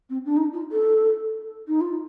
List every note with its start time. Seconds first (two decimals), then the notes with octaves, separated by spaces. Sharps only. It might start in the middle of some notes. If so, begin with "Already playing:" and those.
0.10 C4
0.25 D4
0.37 D#4
0.53 F4
0.72 A4
1.68 D#4
1.81 F4